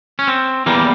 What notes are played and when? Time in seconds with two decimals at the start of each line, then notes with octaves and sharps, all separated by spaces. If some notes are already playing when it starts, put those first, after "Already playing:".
0.19 C#4
0.27 C4
0.66 E2 E3 G3 A#3